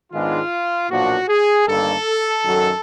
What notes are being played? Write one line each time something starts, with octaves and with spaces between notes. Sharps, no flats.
G#2 D#3 G#3 B3 D4 F4
B1 A#2 F3 A#3 D4 F#4
G#4
G1 G2 D#3 G3 A#3 A4
F#2 D#3 F#3